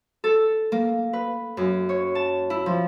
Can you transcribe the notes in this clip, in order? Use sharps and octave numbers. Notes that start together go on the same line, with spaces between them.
A4
A#3
B4
F#2
C#5
A5
E4
F3